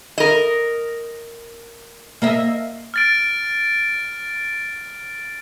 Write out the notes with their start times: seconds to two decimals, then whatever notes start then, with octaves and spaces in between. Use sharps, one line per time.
0.18 A#4 D#5
2.22 A#3 D#5 E5
2.94 F6 A6 D7